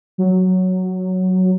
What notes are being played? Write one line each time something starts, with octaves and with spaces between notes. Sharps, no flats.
F#3